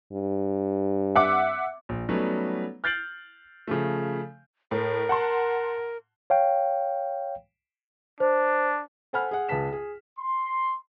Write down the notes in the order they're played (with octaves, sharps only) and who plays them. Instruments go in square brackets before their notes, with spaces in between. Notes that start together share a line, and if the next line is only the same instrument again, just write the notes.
[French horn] G2
[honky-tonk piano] E5 F#5 D6
[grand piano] A#1
F#3 G3 A3 B3 C#4 D#4
F6 G6 A6 C7 D7 F#7
C#3 F3 A3
[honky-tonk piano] A2 [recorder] A#4
[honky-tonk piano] F#5 A5 C6
[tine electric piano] C#5 F5 G5
[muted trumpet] D4 [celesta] C5
[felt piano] A4 C5 F#5 G#5 B5 F6
G#4 F#5
C#2 G#4 B4 A5 B6 E7
G#4
[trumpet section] C6